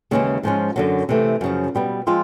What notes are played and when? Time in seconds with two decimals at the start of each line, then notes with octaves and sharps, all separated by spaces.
0.11 D#2 C#3 E3 G#3 C#4
0.43 G#2 F3 G#3 C#4
0.76 F#2 D3 F#3
1.09 C3 E3 A3
1.41 F#2 C#3 F3
1.75 B2 G3 B3
2.07 F3 G#3 C4 F4